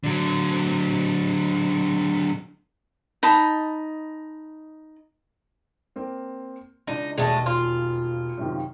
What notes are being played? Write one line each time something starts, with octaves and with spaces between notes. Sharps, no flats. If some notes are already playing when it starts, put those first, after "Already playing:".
D3 F#3
D#4 A5 B5
A#3 C4
C#2 E3 D4 D#4
E1 D#2 G#3 A3
F4
F#2 C3 D#3